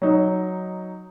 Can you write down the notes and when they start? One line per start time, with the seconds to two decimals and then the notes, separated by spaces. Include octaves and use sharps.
0.02 F#3 D#4